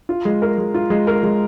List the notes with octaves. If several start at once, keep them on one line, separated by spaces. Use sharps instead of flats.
F4
G#3
A#4
G#3
F4
G#3
A#4
G#3